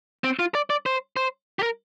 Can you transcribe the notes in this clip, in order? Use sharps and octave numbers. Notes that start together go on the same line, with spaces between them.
C4
F4
D5
D5
C5
C5
G4
A#4